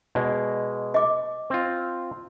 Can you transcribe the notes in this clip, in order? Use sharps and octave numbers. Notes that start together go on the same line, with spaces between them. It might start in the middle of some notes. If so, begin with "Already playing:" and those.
B2 G#3 D5
D#5 D6
C4 F4